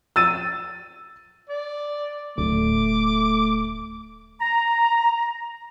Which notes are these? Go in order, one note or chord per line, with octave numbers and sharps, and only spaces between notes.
E6 A6 D#7
D5
D1 A3 D6
A#5